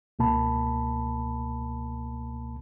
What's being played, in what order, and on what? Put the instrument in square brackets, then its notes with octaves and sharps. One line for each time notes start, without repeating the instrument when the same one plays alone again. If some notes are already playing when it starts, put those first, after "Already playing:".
[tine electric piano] C#2 B2 A#3 A5 B5